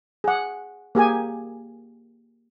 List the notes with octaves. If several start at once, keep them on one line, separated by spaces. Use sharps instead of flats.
G#4 F#5
A#3 G4 G#4 G#5